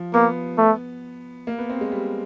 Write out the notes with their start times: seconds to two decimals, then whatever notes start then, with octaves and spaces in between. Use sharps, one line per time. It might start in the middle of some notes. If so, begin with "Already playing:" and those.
Already playing: F3
0.13 A#3 B3
0.58 A3
1.47 A#3
1.59 B3
1.69 C4
1.81 G#3
1.92 G3